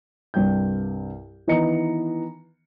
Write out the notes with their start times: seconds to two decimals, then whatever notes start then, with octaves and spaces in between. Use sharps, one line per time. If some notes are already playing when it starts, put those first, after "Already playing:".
0.34 C2 G2 G5 G6
1.47 D#3 E3 B3 D#5 A#5 C#7